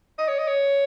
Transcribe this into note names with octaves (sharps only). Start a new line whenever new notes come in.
D#5
C#5
D#5
C#5